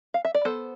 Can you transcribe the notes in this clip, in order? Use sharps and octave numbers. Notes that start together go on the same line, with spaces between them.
F5
E5
D5
B3 A4 C5